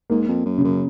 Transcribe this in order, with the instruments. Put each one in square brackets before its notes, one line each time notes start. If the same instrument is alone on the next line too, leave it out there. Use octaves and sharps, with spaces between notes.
[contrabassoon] G#2 [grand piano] A#3
[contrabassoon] F2
F#2
[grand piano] C#3
[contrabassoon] F#2